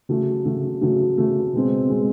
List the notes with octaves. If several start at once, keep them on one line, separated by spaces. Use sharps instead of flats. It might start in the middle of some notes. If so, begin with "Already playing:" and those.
C#3 F#3 A3
C#3 F#3 A3
C#3 F#3 A3
C#3 F#3 A3
B2 G#3 C4
B2 G#3 C4